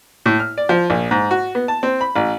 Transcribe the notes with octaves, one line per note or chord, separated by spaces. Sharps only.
A2
F6
D5
F3
A#1
G#2
F#4
B3
A5
C4
B5
A1